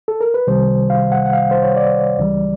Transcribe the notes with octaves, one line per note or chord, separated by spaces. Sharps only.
A4
A#4
B4
C2 C3 D#3 G3 C5
F5
F#5
F#5
F5
C5
C#5
D5
C#2 C#3 E3 G3